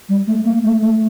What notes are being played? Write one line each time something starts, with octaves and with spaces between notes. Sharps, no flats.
G3
A3
A#3
A3
A3